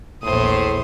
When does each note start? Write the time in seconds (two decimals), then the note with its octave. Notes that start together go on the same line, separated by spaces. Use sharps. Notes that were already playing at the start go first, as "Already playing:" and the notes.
0.23 A#1 E2 A2 C5 D#6